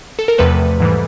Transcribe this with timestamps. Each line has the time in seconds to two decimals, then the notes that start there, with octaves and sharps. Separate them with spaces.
0.19 A4
0.28 A#4
0.38 E2 C3 F3 A3 A4 B4
0.80 G#2 E3 G3